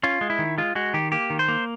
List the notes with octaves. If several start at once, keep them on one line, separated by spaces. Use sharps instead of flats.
C#4 F4
G#3
E4
D#3
G#3 F4
G#3 F#4
D#3 G4
A#3 G4
D#3
C5
A#3